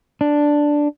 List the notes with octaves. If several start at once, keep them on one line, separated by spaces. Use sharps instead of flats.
D4